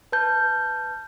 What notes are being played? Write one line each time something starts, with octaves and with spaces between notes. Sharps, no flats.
B4 A5 G6